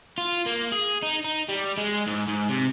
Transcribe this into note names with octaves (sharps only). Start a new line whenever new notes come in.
F4
A#3
G#4
D#4
D#4
G3
G#3
G#2
G#2
C3